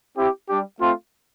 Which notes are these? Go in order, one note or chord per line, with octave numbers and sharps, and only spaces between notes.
C4 E4 G4
G3 D4 G4
A3 C4 F4